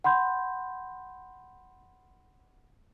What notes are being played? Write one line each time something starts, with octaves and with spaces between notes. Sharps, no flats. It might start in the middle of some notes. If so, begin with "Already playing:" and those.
F#5 B5 C6 G6